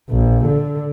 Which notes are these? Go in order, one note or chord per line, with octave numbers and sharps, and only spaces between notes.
A#1
D3